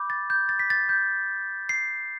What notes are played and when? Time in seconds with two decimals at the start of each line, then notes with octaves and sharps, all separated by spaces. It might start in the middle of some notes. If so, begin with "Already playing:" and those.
Already playing: B5 D6 G6
0.10 A6
0.30 G6
0.49 A6
0.59 B6
0.70 A6
0.89 G6
1.69 C7